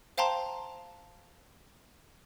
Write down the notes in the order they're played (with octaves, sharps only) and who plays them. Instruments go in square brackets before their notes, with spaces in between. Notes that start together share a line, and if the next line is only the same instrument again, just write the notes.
[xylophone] C5 F5 G5 A5 A#5 C6